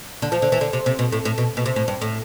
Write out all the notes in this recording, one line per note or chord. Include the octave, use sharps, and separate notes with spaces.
D3
F3
D3
E3
D3
C3
C3
B2
A2
A2
B2
B2
C3
A2
G2
A2